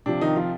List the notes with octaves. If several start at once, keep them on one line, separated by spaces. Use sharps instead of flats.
C3 F3 D4
D#3 D#4
F3 F4